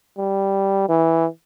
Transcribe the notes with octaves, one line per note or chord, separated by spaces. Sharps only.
G3
E3